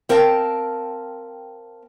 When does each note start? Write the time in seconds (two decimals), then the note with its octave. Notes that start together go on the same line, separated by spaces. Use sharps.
0.09 C4 A#4 F5 G5 A5